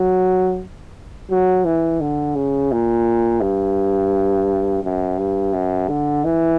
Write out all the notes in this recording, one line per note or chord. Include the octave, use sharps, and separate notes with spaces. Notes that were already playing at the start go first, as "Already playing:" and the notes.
Already playing: F#3
F#3
E3
D3
C#3
A#2
G2
F#2
G2
F#2
D3
E3